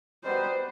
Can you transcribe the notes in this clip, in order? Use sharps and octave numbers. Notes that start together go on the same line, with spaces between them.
G3 B3 D#4 F#4 B4 C5